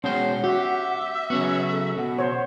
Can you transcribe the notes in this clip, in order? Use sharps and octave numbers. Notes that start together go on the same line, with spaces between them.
B2 G#3 C#4 C5 F#5 G5
F#4 G4 E5
C#3 F#3 B3 C#4 F#4
A4
B2 F#5
C5 C#5